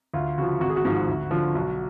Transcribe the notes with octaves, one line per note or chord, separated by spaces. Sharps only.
D2 F4
C#3 F3 F#4
G#1 F#4
G#4
F#4
G#2 F3
D2
D3 F3
B1